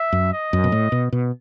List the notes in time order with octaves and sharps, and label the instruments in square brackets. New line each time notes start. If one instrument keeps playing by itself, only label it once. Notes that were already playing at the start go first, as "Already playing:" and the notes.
Already playing: [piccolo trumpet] E5
[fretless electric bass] F#2
[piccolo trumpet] D#5
[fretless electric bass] F#2
B2
A2
B2
B2